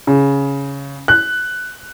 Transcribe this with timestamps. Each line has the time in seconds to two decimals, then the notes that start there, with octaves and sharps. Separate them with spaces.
0.07 C#3
1.08 F#6